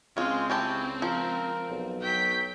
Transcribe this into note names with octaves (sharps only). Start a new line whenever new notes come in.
C#2 G#3 C4 C#4 F4
C#4 E4 G4 A5
F3 A#4
B1
F#3 G5 B6